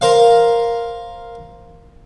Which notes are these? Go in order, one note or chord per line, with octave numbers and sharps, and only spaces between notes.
A#4 C5 F5